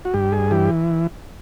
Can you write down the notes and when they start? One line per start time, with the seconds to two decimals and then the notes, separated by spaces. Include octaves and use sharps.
0.05 F#4
0.14 G2 G4
0.32 G#4
0.51 E3 G4